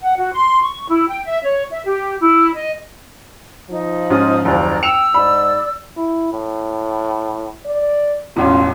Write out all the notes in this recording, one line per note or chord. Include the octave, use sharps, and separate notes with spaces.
F#5
F#4
C6
C#6
E4
G5
E5
C#5
E5
G4
E4
D#5
F3 D#4
G#2 C#4 F4 D#6
F#1 D#2 D5 A#5
G5 E6 C#7 E7 F7
G#2 D5 B5
E4
A2
D5
E1 A1 C#4 F4